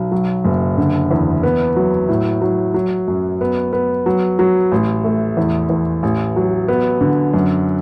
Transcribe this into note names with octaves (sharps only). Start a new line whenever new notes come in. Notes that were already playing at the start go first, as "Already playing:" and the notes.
Already playing: B1
F#3
F#1
D3
E2
B3
F#3
A2
F#3
F#3
F#2
B3
B3
F#3
F#3
A1
A3
E2
E2
A1
F#3
B3
D3
F#2